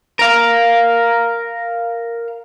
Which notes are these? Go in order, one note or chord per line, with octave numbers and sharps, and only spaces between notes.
A#4 F5